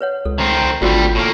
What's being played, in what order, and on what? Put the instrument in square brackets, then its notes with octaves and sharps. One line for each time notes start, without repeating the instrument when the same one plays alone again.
[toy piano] B4 C#5 F#5
[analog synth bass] C#2 [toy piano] A4
[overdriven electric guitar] D#3 C4
[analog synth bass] G#1 [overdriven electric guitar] D2 G3 [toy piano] F4 F#4 A4
[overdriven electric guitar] A2 A#3